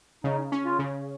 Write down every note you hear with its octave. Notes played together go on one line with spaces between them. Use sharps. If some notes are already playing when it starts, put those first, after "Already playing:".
C#3 D#4
C#4
F4
C#3